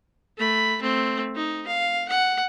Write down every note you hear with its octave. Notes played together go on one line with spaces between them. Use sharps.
A3 B5
A3 C4
D#4
F5
F#5